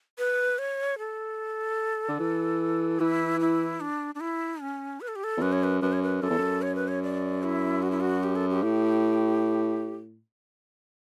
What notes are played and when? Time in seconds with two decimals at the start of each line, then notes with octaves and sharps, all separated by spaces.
0.18 B4
0.58 C#5
0.99 A4
2.09 D3
2.19 E3
3.00 E3 E4
3.40 E4
3.81 D4
4.15 D4
4.20 E4
4.61 C#4
5.01 B4
5.08 A4
5.16 G4
5.24 A4
5.37 E2
5.41 F#2 B4
5.52 C#5
5.63 B4
5.81 F#2 B4
5.93 C#5
6.03 B4
6.22 F#2 A4
6.30 E2
6.38 F#2
6.62 C#5
6.76 B4
6.88 C#5
7.03 D5
7.43 E4
7.82 F#4
7.91 E4
8.00 F#4
8.23 G4
8.36 A4
8.50 G4
8.63 A2